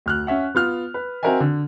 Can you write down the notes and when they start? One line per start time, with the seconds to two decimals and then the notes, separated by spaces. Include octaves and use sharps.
0.06 D2 F6 F#6
0.27 C#4 E5 F#5
0.55 B3 F4 F6
0.94 B4
1.23 C4 F#4 A#4 D#5 E5 G#5
1.40 D3